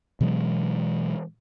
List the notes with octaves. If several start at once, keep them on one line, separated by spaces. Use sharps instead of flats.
B2 E3 F#3 G#3